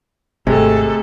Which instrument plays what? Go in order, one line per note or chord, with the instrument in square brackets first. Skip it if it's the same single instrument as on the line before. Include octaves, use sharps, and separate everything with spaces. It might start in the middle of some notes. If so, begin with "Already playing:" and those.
[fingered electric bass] G#1 [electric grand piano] C3 [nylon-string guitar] G#3 [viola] A3 A4